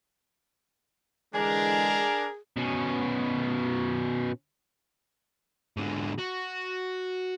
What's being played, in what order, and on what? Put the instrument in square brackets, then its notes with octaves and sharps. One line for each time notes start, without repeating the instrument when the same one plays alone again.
[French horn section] D3 E3 G#3 [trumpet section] D4 A#4 [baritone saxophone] G#4
[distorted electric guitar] B2 C#4
G#2 D3
F#4